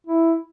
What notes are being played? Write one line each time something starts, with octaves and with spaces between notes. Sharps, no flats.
E4